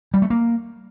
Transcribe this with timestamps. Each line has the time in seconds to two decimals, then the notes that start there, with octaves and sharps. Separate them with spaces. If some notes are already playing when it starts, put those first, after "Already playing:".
0.14 G3
0.22 A3
0.30 A#3